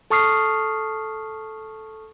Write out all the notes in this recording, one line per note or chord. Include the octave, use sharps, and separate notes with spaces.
A4 A5 C#6 D#6 F6 C7